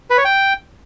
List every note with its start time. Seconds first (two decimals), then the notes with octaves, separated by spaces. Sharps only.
0.10 B4
0.18 C#5
0.25 G5